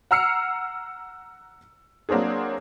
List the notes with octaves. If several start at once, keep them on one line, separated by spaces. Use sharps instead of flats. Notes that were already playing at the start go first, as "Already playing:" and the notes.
F#5 A#5 E6 F6 C7 C#7
F#3 A#3 C4 D4 G#4